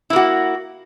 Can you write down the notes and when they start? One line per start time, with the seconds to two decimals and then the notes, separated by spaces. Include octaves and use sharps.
0.10 E4
0.13 A#3
0.16 F#4